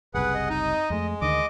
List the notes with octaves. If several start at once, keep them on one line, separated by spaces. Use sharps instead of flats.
F#1 C2 C3 G#4 B4 F#5
D#5
D#4
F2 G#3 A3
D2 D3 D#3 D#5 D6